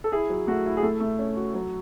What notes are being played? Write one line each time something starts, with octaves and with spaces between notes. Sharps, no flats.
A4
E4 G#4
F#3
A3 F#4
E4
G#4
A3 A4
A3
C#4
F#4
F#3